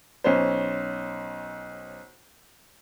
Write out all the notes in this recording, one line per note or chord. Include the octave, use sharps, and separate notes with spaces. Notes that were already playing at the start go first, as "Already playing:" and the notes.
B1 C#4 C5